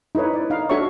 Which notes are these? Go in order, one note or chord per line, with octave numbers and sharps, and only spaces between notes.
D#4 E4 A4 B4 C#5
D5
D#4 F5
D4 F#4 A4 C#5 E5 C#6